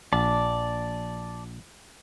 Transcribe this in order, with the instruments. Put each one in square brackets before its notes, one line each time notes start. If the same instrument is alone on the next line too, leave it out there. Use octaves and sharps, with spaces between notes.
[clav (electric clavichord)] A#1 [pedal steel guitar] D5 A5